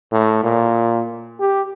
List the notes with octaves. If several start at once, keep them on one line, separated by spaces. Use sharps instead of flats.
A2
A#2
G4